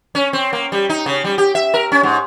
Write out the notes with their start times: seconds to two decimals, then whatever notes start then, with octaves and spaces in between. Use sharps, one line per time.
0.15 C#4
0.33 C4
0.53 A#3
0.72 G3
0.89 D#4
1.06 C#3
1.24 G3
1.38 G4
1.55 E5
1.74 A#4
1.92 C#4
2.03 G#2